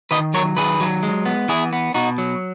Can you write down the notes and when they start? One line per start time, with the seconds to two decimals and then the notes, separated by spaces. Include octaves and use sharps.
0.11 D#3 B4 D#5
0.34 F#3 A#4 C#5
0.57 D#3 G#4 B4
0.81 F#3
1.03 G#3
1.25 B3
1.48 E3 E4 G#4
1.73 B3
1.94 B2 D#4 F#4
2.18 F#3